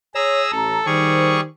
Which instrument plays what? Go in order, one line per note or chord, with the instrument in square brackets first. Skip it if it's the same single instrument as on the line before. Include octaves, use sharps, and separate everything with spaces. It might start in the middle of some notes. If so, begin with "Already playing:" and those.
[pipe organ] G#4 A#5 E6 [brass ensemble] C#5
[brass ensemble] A1 A#5 [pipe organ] A4
[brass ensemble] D#3 C5 [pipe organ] G3 G#4 C#6